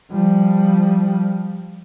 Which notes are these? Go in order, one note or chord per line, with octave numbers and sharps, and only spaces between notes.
F3 G3